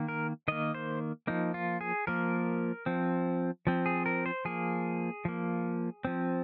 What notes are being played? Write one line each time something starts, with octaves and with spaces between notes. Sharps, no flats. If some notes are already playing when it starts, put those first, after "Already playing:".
Already playing: D#3 A#3
A#4
D#3 A#3 D#5
C5
F3 A#3 D#4
F4
G#4
F3 A#3 A#4
F3 C4
F3 C4
G#4
A#4
C5
F3 A#3 G#4
F3 A#3
F3 C4